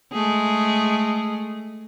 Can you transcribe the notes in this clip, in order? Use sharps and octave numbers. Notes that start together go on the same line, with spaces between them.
G#3 A3 G#4